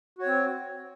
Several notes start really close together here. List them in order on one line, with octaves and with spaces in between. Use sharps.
F#4 C#5 C4